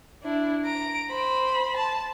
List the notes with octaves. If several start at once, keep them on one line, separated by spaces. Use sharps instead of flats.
D4 E4
A#5 D7
C5 B5
A5